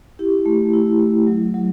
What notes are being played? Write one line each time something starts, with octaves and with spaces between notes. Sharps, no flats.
E4 G4
A3
E4
A3
F#3
F#3